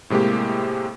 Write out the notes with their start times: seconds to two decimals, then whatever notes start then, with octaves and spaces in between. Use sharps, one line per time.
0.10 A2 C3 G#3 A#3 G4